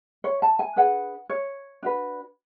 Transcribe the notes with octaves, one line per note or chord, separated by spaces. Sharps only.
C#5
A5
G#5
D4 G#4 B4 F#5
C#5
D4 F#4 B4